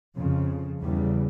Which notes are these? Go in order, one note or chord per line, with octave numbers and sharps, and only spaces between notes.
F2 C#3 F3
E2 C#3 G3